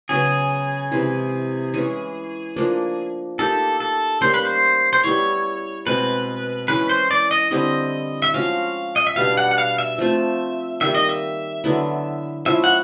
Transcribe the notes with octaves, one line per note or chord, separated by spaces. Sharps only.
C#3 F#3 B3 G#4
C3 E3 G#3
E3 G#3 C#4
F3 A#3 D4
A#3 D#4 G4 A4
A4
G3 A#3 C#4 C5
B4
C5
C5
G3 B3 E4 C#5
B2 G#3 C4 B4
E3 G#3 C#4 B4
C5
D5
D#5
D3 G3 C4 E4 D#5
E5
F3 G#3 C#4 F#4 F5
D#5
E5
B2 G3 B3 D4 F5
F#5
F#5
F5
E5
F3 A3 C4 F4 E5
D#3 G3 A#3 E5
D#5
E5
D3 F#3 B3 E4
F3 G#3 C#4 E4 E5
F#5